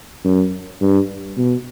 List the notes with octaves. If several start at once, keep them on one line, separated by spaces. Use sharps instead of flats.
F#2
G2
B2